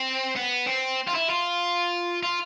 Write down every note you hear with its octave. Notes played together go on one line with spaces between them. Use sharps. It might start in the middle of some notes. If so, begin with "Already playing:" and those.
Already playing: C4
B3
C4
F4
E4
F4
F4